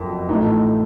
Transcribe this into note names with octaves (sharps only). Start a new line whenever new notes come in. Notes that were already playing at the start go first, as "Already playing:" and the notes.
Already playing: F#1 F2
A1 A2 F3 A3 D#4